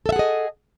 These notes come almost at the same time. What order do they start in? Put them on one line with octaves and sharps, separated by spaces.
A4 E5 F#5 G#4 D#5